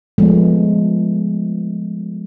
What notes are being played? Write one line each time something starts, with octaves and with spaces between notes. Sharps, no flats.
F3 G#3 A3 B3